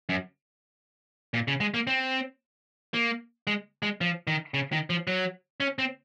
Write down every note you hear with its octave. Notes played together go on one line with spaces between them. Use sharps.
F#2
A#2
C#3
G#3
A#3
C4
A#3
G#3
G#3
F3
D#3
C#3
D#3
F3
F#3
C#4
C4